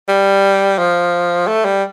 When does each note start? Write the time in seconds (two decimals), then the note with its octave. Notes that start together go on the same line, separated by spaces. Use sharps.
0.09 G3
0.78 F3
1.48 A3
1.65 G3